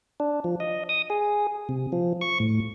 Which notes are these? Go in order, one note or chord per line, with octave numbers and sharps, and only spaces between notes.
D4
F3
D#5
D#6
G#4
C3
F3
C#6
A2